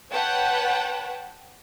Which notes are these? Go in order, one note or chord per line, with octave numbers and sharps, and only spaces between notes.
B4 C#5 F#5 G5 A5